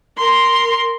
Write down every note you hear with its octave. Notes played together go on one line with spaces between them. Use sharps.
A#4 C6